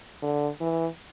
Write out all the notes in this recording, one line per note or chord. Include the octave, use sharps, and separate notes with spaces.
D3
E3